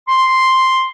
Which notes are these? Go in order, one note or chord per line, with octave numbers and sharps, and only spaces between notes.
C6